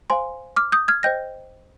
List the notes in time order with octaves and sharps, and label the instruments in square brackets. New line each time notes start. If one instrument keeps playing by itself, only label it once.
[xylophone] C5 F5 G#5 C6
D6 F6
D#6 G6
F6 G#6
C5 D#5 G5 G6 A#6